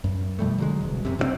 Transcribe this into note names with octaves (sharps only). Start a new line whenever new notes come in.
F#2
B2 F3 G3 A3
D3 F#3 G#3
E1 C2
F#2 C3
C3 D#3 C4